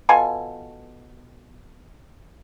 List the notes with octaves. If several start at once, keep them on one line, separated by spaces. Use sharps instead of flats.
B2 F4 A4 G#5